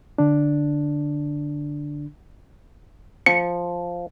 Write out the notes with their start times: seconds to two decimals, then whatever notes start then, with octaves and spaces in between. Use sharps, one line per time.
0.18 D3 D4
3.26 F3 C#7